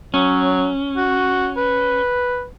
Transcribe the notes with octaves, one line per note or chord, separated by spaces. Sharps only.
F#3 C#4
F#4
B4